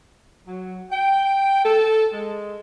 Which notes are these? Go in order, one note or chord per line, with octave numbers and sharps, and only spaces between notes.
F#3
G5
A4
G#3